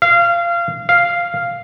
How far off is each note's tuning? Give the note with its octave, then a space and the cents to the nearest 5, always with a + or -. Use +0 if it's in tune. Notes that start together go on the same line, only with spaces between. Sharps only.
F5 -25
F5 -5